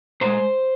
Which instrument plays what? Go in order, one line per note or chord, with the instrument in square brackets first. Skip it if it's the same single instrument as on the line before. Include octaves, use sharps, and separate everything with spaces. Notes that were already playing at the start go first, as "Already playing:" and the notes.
[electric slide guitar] A#2 G#3 C5